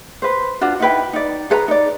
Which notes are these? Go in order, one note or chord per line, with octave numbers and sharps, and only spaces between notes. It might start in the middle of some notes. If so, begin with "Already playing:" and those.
B4 C5
D4 F4 F#4
D#4 E4 B4 G5
D#4 D5
G#4 A4 B4 A#5
D#4 D5